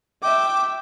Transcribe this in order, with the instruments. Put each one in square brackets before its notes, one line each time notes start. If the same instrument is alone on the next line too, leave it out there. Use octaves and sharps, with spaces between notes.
[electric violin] E5 G5 [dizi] D6